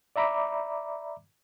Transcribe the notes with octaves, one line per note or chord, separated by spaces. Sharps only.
D5 E5 A#5 B5 D6